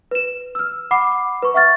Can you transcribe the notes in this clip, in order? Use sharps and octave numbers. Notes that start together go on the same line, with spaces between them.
B4 E7
E6 F6
F#5 B5 D6 C7
B4 C#6
E5 F#5 C#6 F6 A6